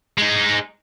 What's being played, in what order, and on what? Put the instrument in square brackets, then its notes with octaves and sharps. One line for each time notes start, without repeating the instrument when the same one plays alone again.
[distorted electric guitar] G#3 D#4